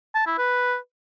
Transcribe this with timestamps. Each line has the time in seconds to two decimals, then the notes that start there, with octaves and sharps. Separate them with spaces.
0.15 A5
0.27 E4
0.38 B4